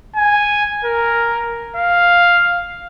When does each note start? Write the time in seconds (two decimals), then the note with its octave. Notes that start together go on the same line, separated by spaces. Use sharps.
0.16 G#5
0.85 A#4
1.76 F5